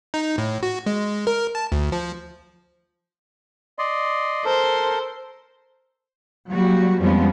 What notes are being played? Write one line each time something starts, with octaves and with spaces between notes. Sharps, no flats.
D#4
A2
F#4
G#3
A#4
A5
D2
F3
D5 D#5 C6
A4 A#4 C5
F#3 G3 A#3 F#4
F2 F3 G3 G#3 B3 C#4